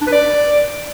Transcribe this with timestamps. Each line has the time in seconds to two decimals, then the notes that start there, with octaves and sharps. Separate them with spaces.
0.01 D4
0.07 B4
0.12 D5